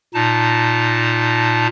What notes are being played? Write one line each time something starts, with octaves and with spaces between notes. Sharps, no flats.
A#2 D#4 A5